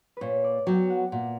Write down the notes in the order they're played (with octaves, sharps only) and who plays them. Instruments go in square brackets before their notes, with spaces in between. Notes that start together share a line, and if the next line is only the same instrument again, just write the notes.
[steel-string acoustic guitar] A#2 [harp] B4 C#5
[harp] D5
[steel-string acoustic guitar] F#3 B3 [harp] G5
[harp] F#5
[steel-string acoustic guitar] A#2